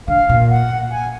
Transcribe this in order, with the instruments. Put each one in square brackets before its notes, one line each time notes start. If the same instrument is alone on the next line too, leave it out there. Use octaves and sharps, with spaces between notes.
[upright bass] D3 [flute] F5
[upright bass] A#2
[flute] F#5
G#5